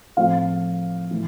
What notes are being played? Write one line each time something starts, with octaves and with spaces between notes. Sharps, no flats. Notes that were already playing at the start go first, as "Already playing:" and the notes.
A2 F3 A3 C4 F5
A2 E3